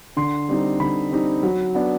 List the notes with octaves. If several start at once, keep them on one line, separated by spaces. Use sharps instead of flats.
D3 C6
G3 C4 D#4
D3 B5
G3 C4 D#4
F#3
B3 D4